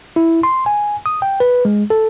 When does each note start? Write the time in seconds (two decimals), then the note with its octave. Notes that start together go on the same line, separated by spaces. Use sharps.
0.16 E4
0.43 C6
0.66 G#5
1.06 D#6
1.22 G5
1.40 B4
1.65 G#3
1.90 A4